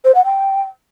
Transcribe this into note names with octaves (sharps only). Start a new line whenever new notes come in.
C5
F#5
G5